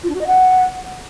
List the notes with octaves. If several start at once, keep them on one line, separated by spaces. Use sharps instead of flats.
F4
D4
F#4
D#5
F#5